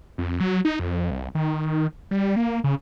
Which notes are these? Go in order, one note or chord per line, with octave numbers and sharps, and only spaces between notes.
F2
F#3
D#4
F2
C2
D#3
G3
A#3
C#3